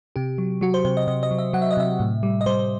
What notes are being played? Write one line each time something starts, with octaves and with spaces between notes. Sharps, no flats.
C3 G4
F#3
F#3 F#4
C5
C3 C5
D#5
C3 D#5
D#5
F#3
E5
F#3 F#5
E5
D#5
C3 E5
A2
G3
D#5
G3 C5